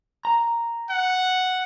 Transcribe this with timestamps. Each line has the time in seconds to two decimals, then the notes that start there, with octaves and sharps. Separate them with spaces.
0.25 A#5
0.90 F#5